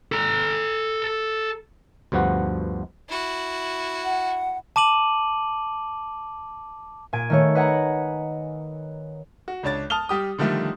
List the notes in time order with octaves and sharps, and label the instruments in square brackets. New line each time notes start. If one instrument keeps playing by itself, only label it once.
[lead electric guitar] A4 A#5
[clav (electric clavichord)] D2 G2 F3 B3 F#4 F#5
[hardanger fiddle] E4 F#4
[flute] F#5
[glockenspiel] A5 D6 D#7 F#7
[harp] A#2 G#5 D7
D#3 A3 C#5
B4 D#5 F#5 G#5 A#5
[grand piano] F#4
C#2 D4 C#5 A6
A5 D#6 F6 F7 G7
G3 G4 D#6
D3 D#3 F3 G3 A3